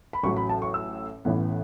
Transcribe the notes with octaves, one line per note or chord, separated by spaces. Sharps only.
B5
A1 A2 F#3 C#6
B5
A5
C#6
E6
A1 A2 E3 B3